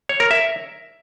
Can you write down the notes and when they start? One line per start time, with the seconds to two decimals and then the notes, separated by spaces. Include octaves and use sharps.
0.09 C#5
0.20 A#4
0.31 E5